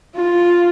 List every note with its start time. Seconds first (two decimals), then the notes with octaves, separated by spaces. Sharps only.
0.15 F4